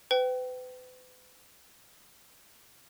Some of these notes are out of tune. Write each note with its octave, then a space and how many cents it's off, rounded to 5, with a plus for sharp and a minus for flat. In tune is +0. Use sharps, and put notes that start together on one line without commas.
B4 +40 G5 -20